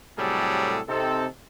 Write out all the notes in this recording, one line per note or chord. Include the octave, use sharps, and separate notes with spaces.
A2 C3 F#3 G3 G#4 A4
C3 C4 D#4 A4